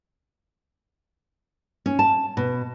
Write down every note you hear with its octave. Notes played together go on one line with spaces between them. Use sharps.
C#4
A5
B2